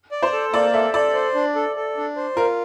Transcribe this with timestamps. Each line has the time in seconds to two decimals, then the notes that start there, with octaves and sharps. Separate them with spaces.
0.11 D5
0.23 C5
0.32 A4
0.54 A#3 D5
0.73 A4 E5
0.94 A4 D5
1.14 C5
1.35 D4
1.55 A4
1.76 A4
1.97 D4
2.16 C5
2.36 F4 A#4